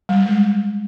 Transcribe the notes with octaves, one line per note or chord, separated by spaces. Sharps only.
G3
G#3